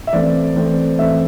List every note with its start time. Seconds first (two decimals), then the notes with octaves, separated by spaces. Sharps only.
0.07 E5
0.13 E3 A3 C4 D5
0.56 E3 A3 C4
0.99 E3 A3 C4 E5